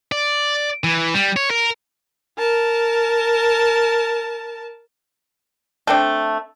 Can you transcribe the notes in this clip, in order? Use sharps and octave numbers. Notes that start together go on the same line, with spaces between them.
D5
E3
G3
C#5
A#4
A#4 A5
A3 C4 D4